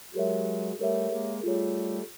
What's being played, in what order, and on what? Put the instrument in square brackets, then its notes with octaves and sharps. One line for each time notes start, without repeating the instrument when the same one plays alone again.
[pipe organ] F#3 G#3 [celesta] G4 A#4 C#5 E5
[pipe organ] G3 A3 [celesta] G4 A#4 C#5 E5
[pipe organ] G#3 A#3
[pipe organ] G3 A3 [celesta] F4 G#4 C#5